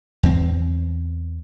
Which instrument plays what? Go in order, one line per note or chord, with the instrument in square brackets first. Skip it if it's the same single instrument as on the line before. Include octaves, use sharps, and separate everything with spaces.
[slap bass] E2 C4